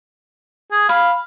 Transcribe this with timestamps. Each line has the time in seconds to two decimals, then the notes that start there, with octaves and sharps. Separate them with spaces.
0.71 G#4
0.89 F5 B5